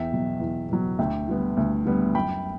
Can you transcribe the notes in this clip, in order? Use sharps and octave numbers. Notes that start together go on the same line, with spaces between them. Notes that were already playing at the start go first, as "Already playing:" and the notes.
Already playing: E2 E5 G5
B2 F#3
E2
B2 F#3
D2 E5 G5
D3 G3 B3
D2
D3 G3 B3
F#2 G5 B5